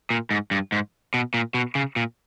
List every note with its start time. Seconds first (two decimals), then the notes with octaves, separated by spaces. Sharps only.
0.10 A#2
0.31 G#2
0.51 G2
0.72 G#2
1.14 B2
1.34 A#2
1.54 B2
1.75 C#3
1.96 A#2